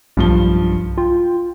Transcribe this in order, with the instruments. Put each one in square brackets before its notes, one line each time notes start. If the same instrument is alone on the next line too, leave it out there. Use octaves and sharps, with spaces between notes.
[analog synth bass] B1 [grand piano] G2 F3 G7
[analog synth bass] F4 [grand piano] G5